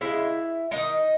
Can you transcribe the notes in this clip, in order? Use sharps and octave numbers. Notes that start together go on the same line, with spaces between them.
C#3 G#3 E4 E5
D#3 G#3 D#4 D#5